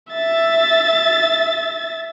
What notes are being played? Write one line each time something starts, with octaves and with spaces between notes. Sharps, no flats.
E5 A6